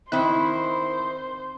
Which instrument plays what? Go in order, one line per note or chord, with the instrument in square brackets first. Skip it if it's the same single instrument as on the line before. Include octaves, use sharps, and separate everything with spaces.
[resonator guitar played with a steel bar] D#3 E4 [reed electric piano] C4 F#6 [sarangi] C5